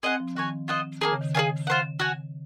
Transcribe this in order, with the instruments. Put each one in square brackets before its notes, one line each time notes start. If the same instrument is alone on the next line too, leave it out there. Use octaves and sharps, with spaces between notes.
[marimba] C4 [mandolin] G#4 D#5 F#5
[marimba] F3
[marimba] D#3 [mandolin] F#4 C#5 G#5
[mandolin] F4 C5 D#5 F#5
[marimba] D#3 [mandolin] A#3 D#4 G#4
[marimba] C#3
D#3
[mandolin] G#4 C#5 F5 G#5
F4 C5 F#5
F#4 C#5 G#5